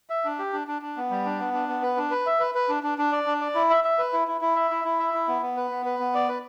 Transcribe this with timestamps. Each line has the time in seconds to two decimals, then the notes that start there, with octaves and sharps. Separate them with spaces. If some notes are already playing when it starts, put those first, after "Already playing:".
0.10 E5
0.25 D4
0.39 G4
0.53 D4
0.67 D4
0.82 D4
0.97 B3
1.10 G3
1.25 D4
1.39 B3
1.53 D4
1.68 B3
1.82 B4
1.97 D4
2.11 B4
2.26 E5
2.40 B4
2.55 B4
2.69 D4
2.83 D4
2.98 D4
3.12 D5
3.26 D4
3.41 D5
3.55 E4
3.70 E5
3.84 E5
3.98 B4
4.13 E4
4.28 E4
4.41 E4
4.56 E5
4.71 E4
4.85 E4
4.99 E5
5.14 E4
5.28 B3
5.42 B3
5.57 B4
5.71 B3
5.86 B4
5.99 B3
6.14 D5
6.29 B4